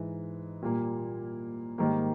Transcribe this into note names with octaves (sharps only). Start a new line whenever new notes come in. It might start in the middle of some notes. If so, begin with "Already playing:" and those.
Already playing: G#2 E3 G#3
A#2 G3 A#3
G#2 D#3 G3 A#3